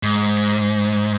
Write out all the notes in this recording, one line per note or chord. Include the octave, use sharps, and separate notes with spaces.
G#2